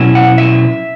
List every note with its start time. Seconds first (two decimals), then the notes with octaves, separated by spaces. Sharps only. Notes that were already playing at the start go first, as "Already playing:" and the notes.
Already playing: B2 F#3 C#4 E4
0.15 F#5
0.38 E5